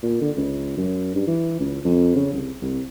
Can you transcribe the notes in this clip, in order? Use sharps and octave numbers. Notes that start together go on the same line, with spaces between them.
A#2
D3
C#2
F#2
G2
E3
C#2
F2
C#3
C2
C2